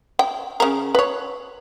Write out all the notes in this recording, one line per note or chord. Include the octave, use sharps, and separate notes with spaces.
G5
C#3 A#4
B4 C#5